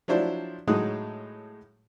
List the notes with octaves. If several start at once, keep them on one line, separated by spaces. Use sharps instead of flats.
F3 F#3 D4 E4 C5 D5
A2 F#3 G#3 D#4 D#6 F#6